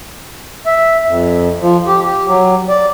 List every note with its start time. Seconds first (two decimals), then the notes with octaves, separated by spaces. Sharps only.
0.66 E5
1.08 F2
1.61 F3
1.87 G4
2.06 G4
2.28 F#3
2.69 D5